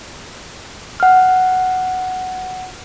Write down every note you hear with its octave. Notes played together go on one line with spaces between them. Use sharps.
F#5 F6